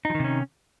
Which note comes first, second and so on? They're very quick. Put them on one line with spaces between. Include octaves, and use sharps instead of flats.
D#4 F3 D#3 C3 C#4